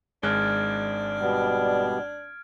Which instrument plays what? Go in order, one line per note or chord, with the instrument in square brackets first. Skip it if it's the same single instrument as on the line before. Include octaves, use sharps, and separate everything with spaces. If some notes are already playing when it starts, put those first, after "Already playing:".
[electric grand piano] G#1 G#3 F#6 [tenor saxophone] D4 [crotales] F6 G#6 D7
[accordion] B2 G3 B3